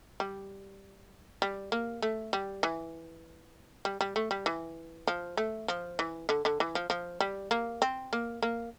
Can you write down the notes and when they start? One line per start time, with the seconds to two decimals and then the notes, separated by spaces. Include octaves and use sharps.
0.20 G3
1.42 G3
1.72 A#3
2.02 A3
2.33 G3
2.63 E3
3.85 G3
4.01 G3
4.16 A3
4.31 G3
4.46 E3
5.07 F3
5.37 A3
5.68 F3
5.99 E3
6.29 D3
6.45 D3
6.60 E3
6.75 F3
6.90 F3
7.20 G3
7.51 A#3
7.82 C4
8.13 A#3
8.42 A#3